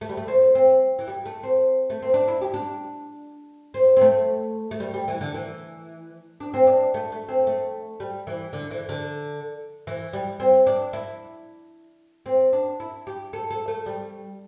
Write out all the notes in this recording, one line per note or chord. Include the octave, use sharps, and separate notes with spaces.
A3
G3
A3
C4
C4
E3
G3
A3
C4
A3
C4
D4
E4
G4
D4
C4
C4
A3
A3
G3
G3
E3
D3
E3
D4
C4
D4
A3
A3
C4
A3
G3
E3
D3
E3
D3
E3
G3
C4
D4
E4
C4
D4
E4
G4
A4
A4
A3
G3